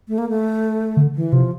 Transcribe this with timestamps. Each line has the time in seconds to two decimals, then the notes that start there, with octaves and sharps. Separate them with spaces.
0.08 A3
0.18 A#3
0.29 A3
0.97 D3
1.15 E3
1.32 C3 F3